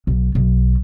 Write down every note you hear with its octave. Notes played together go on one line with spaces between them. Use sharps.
B1
B1